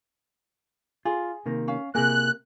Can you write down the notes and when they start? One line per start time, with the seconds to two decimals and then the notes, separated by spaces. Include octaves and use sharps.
1.05 F4 G#4
1.46 C3 D#3 A#3
1.68 C#4 F5
1.95 C3 A#3 E4 G#4 F#6